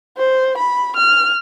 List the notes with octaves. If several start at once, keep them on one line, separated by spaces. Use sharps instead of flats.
C5
B5
F6